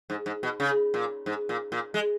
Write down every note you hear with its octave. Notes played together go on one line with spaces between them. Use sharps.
G#2
G#2
B2
C#3
A#2
G#2
A#2
A#2
G#3